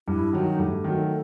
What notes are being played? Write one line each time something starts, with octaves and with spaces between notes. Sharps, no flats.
G2 E4
D#3 F#3 D#4
G2 A3
D#3 F#3